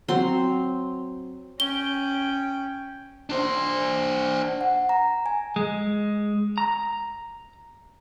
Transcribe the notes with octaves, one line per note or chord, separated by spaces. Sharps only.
F#3 C4 C6
C#4 G5 G7
D4 C5
F#5
A#5
G#5
G#3
A#5